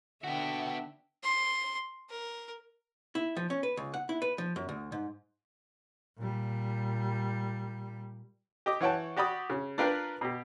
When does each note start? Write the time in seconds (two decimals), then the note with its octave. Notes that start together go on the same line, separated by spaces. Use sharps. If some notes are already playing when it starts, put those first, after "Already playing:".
0.24 D3 B3 F#4 E5 G5
1.23 C6
2.10 A#4
3.15 E4
3.36 F3
3.50 C#4
3.63 B4
3.77 C#2
3.94 F#5
4.09 E4
4.22 B4
4.38 F3
4.56 F#2
4.69 D2
4.92 G#2
6.18 A#2 G3
8.66 G4 D#5 D6
8.81 E3 C#5 F#5 G5 A5
9.16 F#4 G4 D5 B5 D#6
9.50 C#3
9.78 D4 F4 A#4 B4 F5 G5
10.21 B2 G4